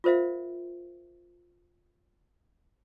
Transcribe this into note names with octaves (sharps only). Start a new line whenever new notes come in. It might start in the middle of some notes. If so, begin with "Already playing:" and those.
F4 A#4 C5 E5 F5